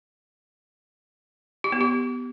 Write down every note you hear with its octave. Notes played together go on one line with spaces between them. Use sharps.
G4
B3
G4